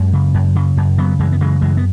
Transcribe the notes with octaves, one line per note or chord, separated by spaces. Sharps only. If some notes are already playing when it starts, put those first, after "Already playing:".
Already playing: F#2 G#3 C#4
C#3
F#2
C#3
F#2
C#3 F#3 B3
F#2 E3 G#3
B3
C#3 E3 G#3
F#2 E3 G#3
B3